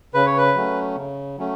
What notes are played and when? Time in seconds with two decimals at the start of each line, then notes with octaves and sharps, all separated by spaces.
0.14 C#3 B4
0.26 C#5
0.37 B4
0.55 F#3 A3 C#4
0.95 C#3
1.37 F#3 A3 C#4